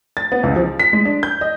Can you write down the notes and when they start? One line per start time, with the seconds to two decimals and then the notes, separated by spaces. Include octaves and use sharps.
0.17 A6
0.32 B3
0.43 C#2
0.56 F3
0.79 B6
0.93 G#3
1.05 D4
1.23 G6
1.41 D#5